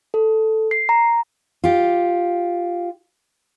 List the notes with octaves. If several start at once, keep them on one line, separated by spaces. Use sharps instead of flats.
A4
C7
A#5
F4 G4